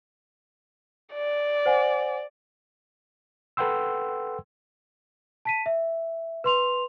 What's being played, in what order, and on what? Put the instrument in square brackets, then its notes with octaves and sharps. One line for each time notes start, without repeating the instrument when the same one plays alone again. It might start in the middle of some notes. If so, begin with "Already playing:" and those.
[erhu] D5
[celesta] C5 F#5 G#5
[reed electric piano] A4 B4 F#5 G5 C6 E6
[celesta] A5 B6 D#7
E5
B4 C6 F7